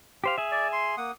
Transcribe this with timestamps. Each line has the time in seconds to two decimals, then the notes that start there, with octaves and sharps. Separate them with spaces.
0.24 G4 C5 F5
0.38 G#4 E5
0.51 D5
0.73 C6
0.97 A#3 F#5 D#6